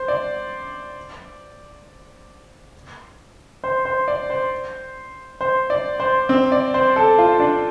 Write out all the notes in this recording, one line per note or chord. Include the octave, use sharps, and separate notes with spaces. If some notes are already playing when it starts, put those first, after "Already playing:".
Already playing: C5
D5
C5
C5
D5
C5
C5
D5
C5
C4
D5
C5
A4
F4
D4